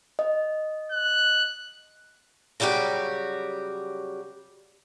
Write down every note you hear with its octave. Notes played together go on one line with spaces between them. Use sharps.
D#5
F#6
C#3 F#3 G3 F#4 G4